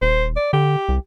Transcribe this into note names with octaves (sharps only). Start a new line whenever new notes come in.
D#1 C5
D5
D3 G4
C2